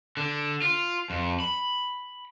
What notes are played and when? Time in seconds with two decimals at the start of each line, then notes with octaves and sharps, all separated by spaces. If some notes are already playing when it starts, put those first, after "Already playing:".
0.17 D3
0.62 F4
1.10 F2
1.40 B5